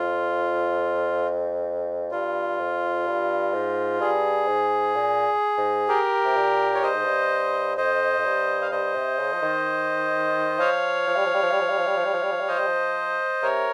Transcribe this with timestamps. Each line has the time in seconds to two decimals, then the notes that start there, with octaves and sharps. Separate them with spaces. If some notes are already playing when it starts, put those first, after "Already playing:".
Already playing: F2 F4
2.12 G2 F4
2.59 F2
3.06 G2
3.53 G#2
4.00 G2 G#4
4.47 G#2
4.95 A#2
5.57 G#2
5.88 G4 A#4
6.24 C3
6.36 A#2
6.75 C#5
6.83 G2 C5 D#5
6.94 G#2
7.05 G2
7.77 F2 C5 D#5
8.18 F2
8.24 G2
8.61 F5
8.71 G2 C5 D#5
8.94 C3
9.19 C#3
9.33 F3
9.42 D#3
10.59 F3 C#5 F5
11.07 F3
11.16 G3
11.25 F3
11.34 G3
11.42 F3
11.51 G3
11.60 F3
11.69 G3
11.78 F3
11.87 G3
11.96 F3
12.05 G3
12.13 F3
12.22 G3
12.31 F3
12.40 G3
12.48 F3 C5 D#5
12.58 G3
12.67 F3
13.42 C3 A#4 C#5